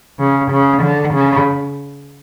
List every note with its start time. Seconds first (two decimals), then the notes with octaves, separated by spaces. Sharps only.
0.19 C#3
0.51 C#3
0.83 D3
1.14 C#3